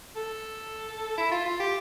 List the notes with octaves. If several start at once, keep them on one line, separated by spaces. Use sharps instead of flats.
A4
E4
F4
F4
G4